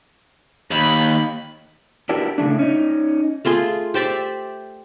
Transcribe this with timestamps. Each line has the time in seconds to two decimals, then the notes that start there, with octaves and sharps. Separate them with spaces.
0.71 D#2 B5
2.09 D4 E4 F#4 G4 A#4 B4
2.38 A2 C#3 G3 A3 D4
2.59 C#4 D#4
3.45 A3 F4 G#4 C6
3.94 G4 C5 D5 E5